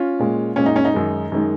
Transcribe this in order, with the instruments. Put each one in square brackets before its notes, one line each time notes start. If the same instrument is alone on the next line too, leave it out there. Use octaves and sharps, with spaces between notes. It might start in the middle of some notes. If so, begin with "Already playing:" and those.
Already playing: [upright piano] C#4 F4
A#2 G#3
A#2 G#3 C#4
D#4
C#4
D#4
F#2 D#3 G#3
F#2 D#3 G#3